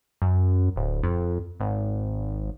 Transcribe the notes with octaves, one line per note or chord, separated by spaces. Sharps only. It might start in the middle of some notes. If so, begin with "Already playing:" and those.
F#2
D1
F2
G#1